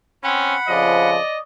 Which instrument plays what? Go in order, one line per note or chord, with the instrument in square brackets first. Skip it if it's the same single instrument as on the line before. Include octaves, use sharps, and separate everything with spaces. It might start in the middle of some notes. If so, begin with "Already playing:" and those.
[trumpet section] C4 C#4 [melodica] F#5 B5
[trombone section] F2 C#3 F3 [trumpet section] D5 D#5